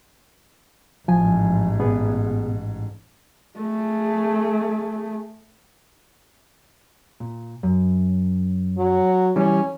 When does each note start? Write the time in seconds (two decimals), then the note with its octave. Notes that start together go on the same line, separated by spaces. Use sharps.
1.08 A1 G#2 F3 G#5
1.80 A#2 B3 G#4
3.58 A3 G#4
7.20 A#2
7.63 F#2
8.78 F#3
9.36 E3 G3 C#4